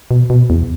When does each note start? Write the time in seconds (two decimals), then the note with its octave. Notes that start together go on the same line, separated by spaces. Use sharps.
0.11 B2
0.30 B2
0.50 E2